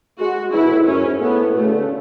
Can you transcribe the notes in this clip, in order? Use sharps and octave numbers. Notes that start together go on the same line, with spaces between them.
G#3 F#4
E3 E4
B2
A2
G#2
F#2 C#4
G#2
A2 B3
B2 A3
C#3
D3
C#3